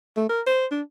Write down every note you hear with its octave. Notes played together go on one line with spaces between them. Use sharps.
A3
A#4
C5
D4